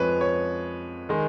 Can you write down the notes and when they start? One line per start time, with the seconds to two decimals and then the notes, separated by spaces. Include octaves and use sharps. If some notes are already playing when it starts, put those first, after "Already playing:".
Already playing: F2 F3 G#3 B4 C#5
0.21 C#5
1.09 D#3 G#3